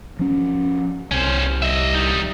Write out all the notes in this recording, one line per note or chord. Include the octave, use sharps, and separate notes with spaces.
F3 C#4
C2 C#4 C5
D#5 E5
G3 D#4